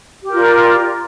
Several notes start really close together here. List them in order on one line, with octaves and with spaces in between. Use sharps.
G4 A#4 F4 D5